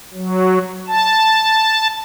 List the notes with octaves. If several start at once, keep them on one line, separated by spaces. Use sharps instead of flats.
F#3
A5